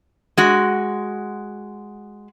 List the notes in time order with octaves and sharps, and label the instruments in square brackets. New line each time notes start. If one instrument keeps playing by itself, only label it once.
[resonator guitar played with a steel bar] G#3 F#4